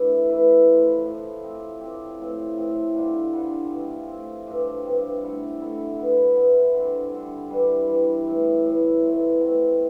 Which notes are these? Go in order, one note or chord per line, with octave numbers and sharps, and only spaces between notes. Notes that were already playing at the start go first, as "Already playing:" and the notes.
Already playing: E3 A3 D4 E4 B4
E3 A3 E4 B4
A2 F3 A3
A2 F3 A3
F3 C4 G4
F3 C4 G4
A2 F3 C4
A2 F3 C4
D3 G3 D4 F4
D3 G3 D4 F4
F3 A3 C4
F3 A3 C4
G2 F3 C4 G4
G2 F3 C4 G4
D3 A3 E4 A4
D3 A3 E4 A4
F3 B3 E4 B4
F3 B3 E4 B4
D3 G3 C4
D3 G3 C4
E3 G3 D4
E3 G3 D4
A2 E3 A3
A2 E3 A3
B2 A3 C4
B2 A3 C4